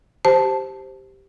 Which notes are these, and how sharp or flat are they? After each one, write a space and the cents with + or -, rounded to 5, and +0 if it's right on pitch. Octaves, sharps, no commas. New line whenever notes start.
G4 +0 C5 +0 A5 +0